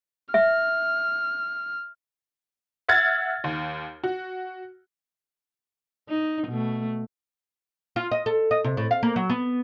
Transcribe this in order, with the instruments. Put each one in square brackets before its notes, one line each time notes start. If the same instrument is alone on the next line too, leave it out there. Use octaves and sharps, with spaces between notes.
[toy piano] E5 [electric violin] F6
[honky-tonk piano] E5 F#5 F6 G#6 A6
D#2
F#4
[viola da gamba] D#4
B2 A3
[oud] F4
D#5
A4
D#5
C3
A2
F5
A#3
F#3
B3